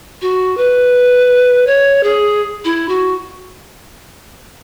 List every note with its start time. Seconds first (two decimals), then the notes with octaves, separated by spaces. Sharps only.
0.22 F#4
0.57 B4
1.67 C#5
2.03 G#4
2.65 E4
2.89 F#4